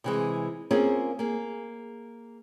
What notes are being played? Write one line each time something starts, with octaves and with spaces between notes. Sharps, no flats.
C3 E3 G#3
A#3 C4 C#4 F4 G#4 A#4
A#3 G#4